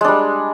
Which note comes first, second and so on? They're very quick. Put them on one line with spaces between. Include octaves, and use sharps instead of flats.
G#3 D4 G3